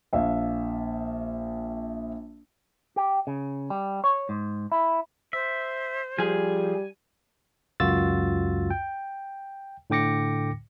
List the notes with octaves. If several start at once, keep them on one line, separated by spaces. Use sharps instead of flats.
A#1 E5 F5
G4
C#3
G3
C#5
G#2
E4
C5 E5
F3 G3 G#4 G#5
C#2 F#2 F4 F#4 E6 A6
G5
A2 D3 G5 D6 A#6 C#7